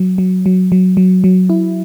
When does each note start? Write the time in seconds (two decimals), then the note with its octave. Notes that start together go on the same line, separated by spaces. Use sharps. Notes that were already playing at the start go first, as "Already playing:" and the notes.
Already playing: F#3
0.18 F#3
0.46 F#3
0.72 F#3
0.97 F#3
1.24 F#3
1.50 E4